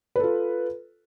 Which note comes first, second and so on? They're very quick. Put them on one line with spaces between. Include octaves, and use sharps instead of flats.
B4 A4 F4